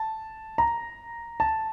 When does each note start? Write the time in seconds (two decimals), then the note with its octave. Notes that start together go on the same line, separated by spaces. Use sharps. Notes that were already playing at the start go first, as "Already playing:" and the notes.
Already playing: A5
0.58 A#5
1.40 A5